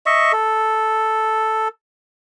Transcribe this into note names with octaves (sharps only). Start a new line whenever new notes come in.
D#5 E5 C#6
A4